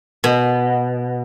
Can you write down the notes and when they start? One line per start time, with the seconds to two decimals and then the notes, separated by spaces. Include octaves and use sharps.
0.24 B2